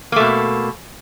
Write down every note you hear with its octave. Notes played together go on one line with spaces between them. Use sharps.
B2 A3 A#3